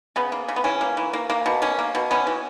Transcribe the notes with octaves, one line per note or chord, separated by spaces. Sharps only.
C#3 B3
A#3
C#3
B3
E3 C#4
A#3
E3
A#3
A#3
B2
A#3 C#4
A#3
B2
B3 C#4
E3